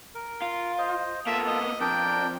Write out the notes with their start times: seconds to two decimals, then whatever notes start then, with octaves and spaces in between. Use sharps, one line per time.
0.15 A#4
0.42 F4
0.78 C5 D#5
1.27 A#3 B3 F4 A4 E5
1.47 D#5
1.81 F2 D4 A#4 D5 G5